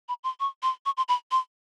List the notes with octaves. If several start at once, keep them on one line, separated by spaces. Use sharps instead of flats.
B5
C6
C#6
C6
C#6
C6
B5
C6